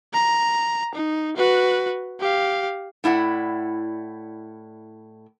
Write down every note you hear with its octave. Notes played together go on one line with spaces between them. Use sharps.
A#5
D#4
F#4 B4
G4 F5
A2 E4 D5 F#5